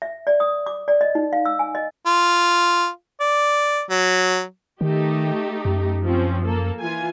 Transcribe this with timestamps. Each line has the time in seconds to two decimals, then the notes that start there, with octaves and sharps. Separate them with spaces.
0.02 E5
0.27 D5
0.40 D#6
0.66 D6
0.88 D5
1.01 D#5
1.15 D#4
1.33 F5
1.46 E6
1.59 G#5
1.75 D#5
2.06 F4
3.21 D5
3.90 F#3
4.81 D#3 A3 D#4 G4
5.65 F#2
6.03 F3 C4 C#4
6.45 A#3 A4
6.81 E3 F4 G#5